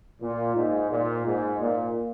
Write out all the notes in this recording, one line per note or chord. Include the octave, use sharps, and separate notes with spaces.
A#2
G#2
A#2
G#2
A#2